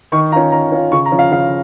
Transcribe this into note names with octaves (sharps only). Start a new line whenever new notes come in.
D#3 C#6
C#4 F4 A#5
D#3 A#5
C#4 F4
C#3 C#6
A#5
F3 C#4
F5
C#3 F5